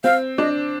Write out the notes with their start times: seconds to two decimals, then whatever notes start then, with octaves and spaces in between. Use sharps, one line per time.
0.04 C4 F5
0.38 D4 D#5